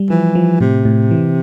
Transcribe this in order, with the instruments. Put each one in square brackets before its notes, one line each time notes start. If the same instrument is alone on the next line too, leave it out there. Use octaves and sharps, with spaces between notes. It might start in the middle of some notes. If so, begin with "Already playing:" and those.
Already playing: [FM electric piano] G3
[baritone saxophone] E3 [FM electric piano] F3
[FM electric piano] F3
[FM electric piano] A2 [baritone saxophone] C3
[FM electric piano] A2
E3